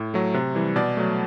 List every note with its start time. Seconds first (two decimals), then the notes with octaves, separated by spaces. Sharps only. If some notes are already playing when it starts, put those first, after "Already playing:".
Already playing: A2
0.14 F#3 A3
0.34 C3
0.55 E3 G3
0.76 B2 D5
0.97 F#3 A3